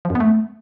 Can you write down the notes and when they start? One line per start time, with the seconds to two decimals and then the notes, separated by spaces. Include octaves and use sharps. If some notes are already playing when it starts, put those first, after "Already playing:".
0.05 F3
0.10 F#2
0.15 B3
0.20 A3